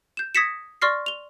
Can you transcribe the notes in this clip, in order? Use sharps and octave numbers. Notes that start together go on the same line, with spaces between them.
G6 E7
D#6 G#6 A#6 B6 C#7 E7
D5 C6 C#6 F6 A#6 C7
F7 G7